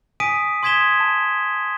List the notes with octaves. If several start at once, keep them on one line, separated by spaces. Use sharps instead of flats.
G#5 D#6 B6 D7 D#7
C6 D#6 G#6 B6 E7 G7
A5